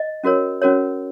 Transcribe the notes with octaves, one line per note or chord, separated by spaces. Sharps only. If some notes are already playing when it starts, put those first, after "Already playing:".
Already playing: D#5
C#4 F#4 A#4 C#5
C#4 F#4 A#4 C#5